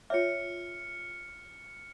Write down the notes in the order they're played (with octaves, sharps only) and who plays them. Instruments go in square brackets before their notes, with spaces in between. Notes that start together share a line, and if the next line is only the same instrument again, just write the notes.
[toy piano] F4 C#5 E5 [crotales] F6 C#7